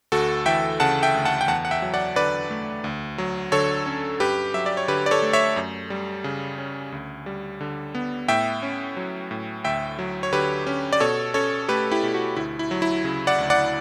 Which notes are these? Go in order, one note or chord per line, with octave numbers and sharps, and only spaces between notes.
D2 F#4 A4
E3 E5 G5
C#3 F#5 A5
E5 G5
D2
F#5 A5
G5
E2 F#5 A5
F#5
E5 G5
F#3
D5 F#5
D3 B4 D5
A3
D2
F#3
D3 A4 C#5
C#4
G2 G4 B4
F#3 E5
D5
C#5
D3 G4 B4
D5
A4 C#5
A3
C#5 E5
F#2
G3
C#3
C#4
D2
G3
D3
B3
A2 E5 G5
C#4
F#3
A2
D2 E5 G5
F#3
C#5
D3 G4 B4
C#4
D5
B2 A4 C#5
C#4 A4 C#5
A3 G4 B4
E4 G4
B2
F#4
D2 E4
E4
F#3
E4
C#3
D5 F#5
D2
D5 F#5